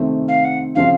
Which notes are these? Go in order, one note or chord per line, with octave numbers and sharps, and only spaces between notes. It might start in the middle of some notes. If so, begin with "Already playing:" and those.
Already playing: C3 D#3 A3 C4
F5
F#5
C#3 F3 C4 F4 F5